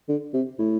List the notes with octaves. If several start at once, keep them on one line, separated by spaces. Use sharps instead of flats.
D3
C3
A2